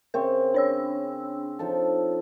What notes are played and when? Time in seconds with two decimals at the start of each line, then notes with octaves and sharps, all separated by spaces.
0.14 C#3 C4 A#4 C#6
0.54 D4 C#5 E6
1.59 F3 D#4 A4